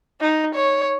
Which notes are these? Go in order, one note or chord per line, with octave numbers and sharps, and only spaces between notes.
D#4
C#5